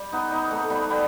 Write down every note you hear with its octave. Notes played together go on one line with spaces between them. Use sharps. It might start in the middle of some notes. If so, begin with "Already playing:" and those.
Already playing: G3
B3 D#4
B3 D#4
A3 C4
G3 B3
G3 B3